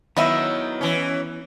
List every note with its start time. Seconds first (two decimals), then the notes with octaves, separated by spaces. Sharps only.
0.17 D#3 F#3 B3 E4 B4 D#5 E5
0.81 E3 C#4